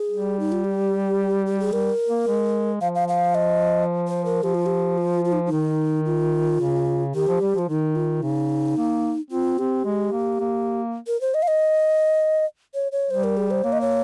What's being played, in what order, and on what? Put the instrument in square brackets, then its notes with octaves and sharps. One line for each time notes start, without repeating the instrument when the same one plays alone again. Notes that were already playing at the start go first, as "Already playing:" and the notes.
Already playing: [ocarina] G#4
[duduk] G3
[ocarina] D#4
F4
G4
G4
G#4
[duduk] G3 [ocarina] A#4
[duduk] A#3
G#3
[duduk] F3 [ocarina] F5
[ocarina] F5
F5
D#5
C5
A#4
[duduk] F3 [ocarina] G4
[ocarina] F4
G4
F4
F4
D#4
D#4
[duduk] D#3
[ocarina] F4
[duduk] C#3
[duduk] D#3 [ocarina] G4
[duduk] F3
G3
[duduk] F3 [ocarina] F4
[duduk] D#3 [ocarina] D#4
[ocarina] F4
[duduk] C#3 [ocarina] D#4
[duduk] A#3
[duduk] C4 [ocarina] F4
[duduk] C4 [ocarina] G4
[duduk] G#3
A#3
A#3
[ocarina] A#4
C5
D#5
F5
D#5
C#5
C#5
[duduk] G3 [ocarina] C5
[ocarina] A#4
G#4
C5
[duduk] A#3 [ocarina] C#5
[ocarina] D#5
C#5